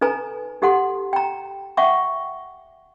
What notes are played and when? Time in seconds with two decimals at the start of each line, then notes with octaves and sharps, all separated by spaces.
0.01 D#4 A4 B4 G#5 A#5
0.62 D#4 G4 A4 F#5 C6
1.13 G5 A#5
1.77 E5 F#5 G5 C#6 D6